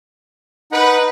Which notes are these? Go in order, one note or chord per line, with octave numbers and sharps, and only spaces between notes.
D#4 B4 F#5